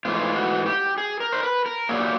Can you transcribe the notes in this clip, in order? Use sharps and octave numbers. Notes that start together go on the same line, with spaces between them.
G#2 E3 A3 F4
F#4
G4
G#4
A#4
C5
B4
A#4
A#2 F#3 A#3 G#4
G4